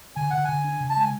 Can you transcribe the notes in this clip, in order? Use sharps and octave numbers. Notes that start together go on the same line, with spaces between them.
D3 G#5
D3 F#5
D3 G#5
D4
C#3
A5
G#3 G#5